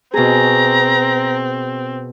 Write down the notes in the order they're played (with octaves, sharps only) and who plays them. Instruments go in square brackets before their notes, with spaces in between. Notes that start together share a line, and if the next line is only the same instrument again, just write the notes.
[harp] B2 G#4 [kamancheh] C4 [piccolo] A#5